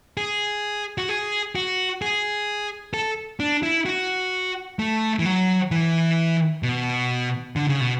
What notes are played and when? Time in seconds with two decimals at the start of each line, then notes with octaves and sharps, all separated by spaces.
0.17 G#4
0.98 F#4
1.09 G#4
1.56 F#4
2.02 G#4
2.94 A4
3.40 D4
3.63 E4
3.86 F#4
4.79 A3
5.19 E3
5.26 F#3
5.71 E3
6.63 B2
7.56 D3
7.68 C#3
7.81 B2